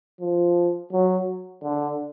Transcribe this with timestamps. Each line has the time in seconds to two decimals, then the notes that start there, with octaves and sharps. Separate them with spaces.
0.21 F3
0.92 F#3
1.63 D3